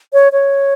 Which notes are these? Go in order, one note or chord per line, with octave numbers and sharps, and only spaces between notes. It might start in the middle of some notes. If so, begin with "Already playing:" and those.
C#5
C#5